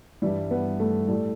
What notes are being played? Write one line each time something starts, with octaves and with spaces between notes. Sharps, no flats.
G2 E3 G3 E4
B3
A3
A2 G3 A3